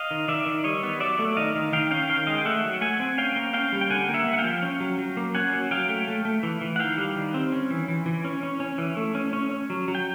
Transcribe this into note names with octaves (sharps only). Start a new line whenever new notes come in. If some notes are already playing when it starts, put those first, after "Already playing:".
Already playing: D#5 F5
D#3
D#3 D5 E5
D#3
G3 C#5 D#5
B3
F#3 D5 E5
A3
D#3 D#5 F5
D#3
D#3 F5 G5
C#4 F5 G5
D#3 F5 G5
G#3 D#5 F5
G5
A3 E5 F#5
F#3
A3 F#5 G#5
C4
C#4 F5 G5
A#3
C#4 F5 G5
G3
G5
D3 F#5 G#5
A#3
E5 F#5
A#3
F#5
F5 G5
F3
C#4
F#3
F#3
A#3
C#4 F#5 G#5
F#3
F#3 F5 G5
A3
A3
A3
E3
E3
F#5
D#3 F5 G5
G3
D#3
C4
C#4
E3
E3
E3
C#4
C#4
C#4
E3
A3
C#4
C#4
C#4
F#3
F#3
G5